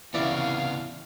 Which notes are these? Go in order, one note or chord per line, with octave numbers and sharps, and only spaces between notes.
C2 C#3 E3 G3 B3 D5 E5 F5